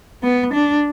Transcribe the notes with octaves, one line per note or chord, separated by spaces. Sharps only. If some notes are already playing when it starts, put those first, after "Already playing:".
B3
D4